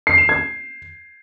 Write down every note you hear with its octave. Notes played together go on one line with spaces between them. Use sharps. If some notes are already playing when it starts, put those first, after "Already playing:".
C7
E7
G#6